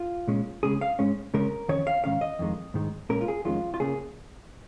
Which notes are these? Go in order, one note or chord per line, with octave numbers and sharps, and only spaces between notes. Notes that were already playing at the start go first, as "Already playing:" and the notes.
Already playing: F4
A#2 G#3 C#4
C#3 G#3 C#4 G#4
F5
G#2 G#3 C#4
C#3 G#3 C#4 A#4
F2 D#3 C#4 C#5
F5
G#2 D#3 C#4 F5
D#5
F2 D#3 G#3
G#2 D#3 G#3
A#2 G#3 C#4 A#4
F4
G#4
F2 D#3 G#3 C#4 F4
F4
C#3 A#3 C#4 G#4